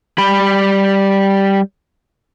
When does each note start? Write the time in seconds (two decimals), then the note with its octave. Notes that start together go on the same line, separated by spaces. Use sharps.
0.18 G3 B5